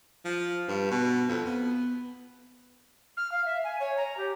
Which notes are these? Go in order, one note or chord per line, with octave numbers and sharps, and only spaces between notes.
F3
G2
B2
F2
B3
F6
F5
E5
G#5
C#5
A#5
G4